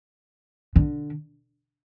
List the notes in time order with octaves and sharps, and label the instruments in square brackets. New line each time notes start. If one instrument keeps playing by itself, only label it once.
[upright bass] D3